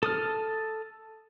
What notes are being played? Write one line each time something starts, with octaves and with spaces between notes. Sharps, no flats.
A4 D#6 F6